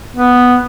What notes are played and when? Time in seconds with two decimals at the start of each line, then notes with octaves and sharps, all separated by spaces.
0.16 B3